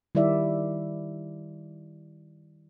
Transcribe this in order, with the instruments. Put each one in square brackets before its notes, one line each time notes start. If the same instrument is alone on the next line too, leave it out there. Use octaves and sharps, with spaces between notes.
[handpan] D#3 G3 E4 D5 E5